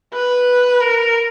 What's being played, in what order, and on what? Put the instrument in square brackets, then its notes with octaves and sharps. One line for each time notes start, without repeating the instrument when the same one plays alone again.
[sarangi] B4
A#4